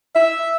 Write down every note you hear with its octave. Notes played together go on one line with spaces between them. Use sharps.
E5